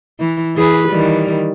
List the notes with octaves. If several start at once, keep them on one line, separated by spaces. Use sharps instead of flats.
E3
E3 G#4 B4
D#3 E3 G3